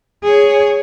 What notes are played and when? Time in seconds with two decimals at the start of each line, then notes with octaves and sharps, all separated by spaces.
0.23 G#4 C#5